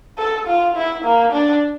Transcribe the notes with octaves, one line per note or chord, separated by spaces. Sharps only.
A4
F4
E4
A#3
D4